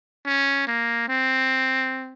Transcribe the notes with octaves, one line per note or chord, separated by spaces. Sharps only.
C#4
A#3
C4